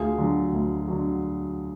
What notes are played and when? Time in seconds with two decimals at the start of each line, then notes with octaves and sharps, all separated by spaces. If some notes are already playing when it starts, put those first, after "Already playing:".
Already playing: D2 F4 G#4
0.18 D3 F#3
0.53 D2
0.88 D3 F#3